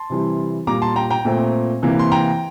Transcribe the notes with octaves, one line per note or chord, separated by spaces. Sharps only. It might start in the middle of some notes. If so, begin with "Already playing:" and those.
Already playing: A5 C6
C3 E3 G3
A#2 G3 A#3 A#5 D6
A5 C6
G5 A#5
G5 A#5
A#2 A3 C4
C3 E3 A#3
C6
G5 A#5